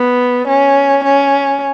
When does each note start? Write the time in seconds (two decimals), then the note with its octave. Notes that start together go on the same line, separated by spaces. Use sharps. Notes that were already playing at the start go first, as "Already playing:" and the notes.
Already playing: B3
0.48 C#4
1.04 C#4